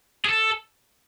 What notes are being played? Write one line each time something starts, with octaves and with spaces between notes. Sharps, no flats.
G#4
A4